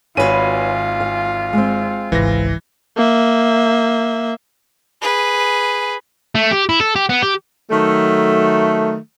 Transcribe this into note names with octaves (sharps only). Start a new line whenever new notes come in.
G#1 F4 F#4 B4 C#5 G#5 D#7
F5
G#3 C4
G#1 C#2 E3 A#6
A#3 E5
G#4 B4
A3
G4
E4
A4
G4
B3
G4
D#3 F#3 A3